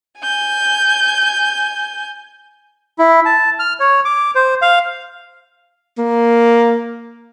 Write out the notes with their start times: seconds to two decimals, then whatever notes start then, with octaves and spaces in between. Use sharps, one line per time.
0.20 G#5 G6
2.99 E4
3.25 A5
3.59 F6
3.80 C#5
4.05 D6
4.35 C5
4.62 F5
5.98 A#3